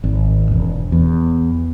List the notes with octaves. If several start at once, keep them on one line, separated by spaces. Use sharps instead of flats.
G#1
E1
E2